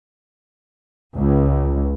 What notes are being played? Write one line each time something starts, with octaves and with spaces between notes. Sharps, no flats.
C#2